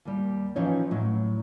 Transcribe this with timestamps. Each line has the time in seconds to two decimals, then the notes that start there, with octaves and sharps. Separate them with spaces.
0.05 D#2 G3
0.56 E3 F3 C#4 D#4 C#5
0.91 A2 F#3